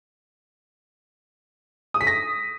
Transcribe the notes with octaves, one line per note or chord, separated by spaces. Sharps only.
D#6
B6
A#6